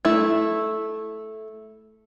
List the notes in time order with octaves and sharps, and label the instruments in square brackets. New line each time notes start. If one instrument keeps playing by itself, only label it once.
[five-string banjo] A3 E4